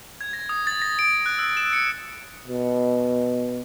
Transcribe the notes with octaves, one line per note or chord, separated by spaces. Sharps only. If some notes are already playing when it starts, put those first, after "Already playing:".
G#6
A#6
D#6
A6
A#6
D7
F#6
E6
E7
C#7
B2